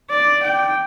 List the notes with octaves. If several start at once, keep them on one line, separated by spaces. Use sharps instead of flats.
D5
G5